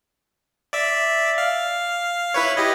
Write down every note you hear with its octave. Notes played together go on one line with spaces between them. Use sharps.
D5 E5
F5
E4 B4 C#5
G4 D#5